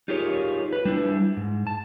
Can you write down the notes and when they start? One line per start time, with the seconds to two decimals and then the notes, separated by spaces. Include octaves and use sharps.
0.08 D#4 F4 G4 G#4 A#4 C#5
0.73 B4
0.85 G3 D4 E4
1.37 G#2
1.67 A5